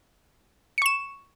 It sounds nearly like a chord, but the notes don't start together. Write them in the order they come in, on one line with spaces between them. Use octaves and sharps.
C#7 C#6 E7